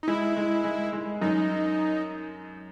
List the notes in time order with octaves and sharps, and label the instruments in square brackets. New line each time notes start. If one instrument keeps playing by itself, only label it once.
[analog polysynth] D#4
[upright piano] G#3 [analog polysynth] E4
[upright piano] G#3
G#3
G#3
[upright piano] F#2 [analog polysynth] D#4